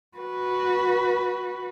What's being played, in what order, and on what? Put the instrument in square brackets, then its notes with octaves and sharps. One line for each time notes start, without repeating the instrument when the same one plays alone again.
[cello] F#4 B4